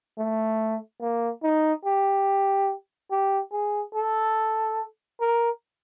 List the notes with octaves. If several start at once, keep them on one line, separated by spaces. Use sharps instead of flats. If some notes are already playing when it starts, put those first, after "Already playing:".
A3
A#3
D#4
G4
G4
G#4
A4
A#4